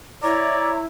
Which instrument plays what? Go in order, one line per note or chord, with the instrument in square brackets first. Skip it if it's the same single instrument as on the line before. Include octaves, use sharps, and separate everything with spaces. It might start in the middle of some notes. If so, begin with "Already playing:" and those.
[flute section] E4 [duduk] C#5 [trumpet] D5 [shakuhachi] A#5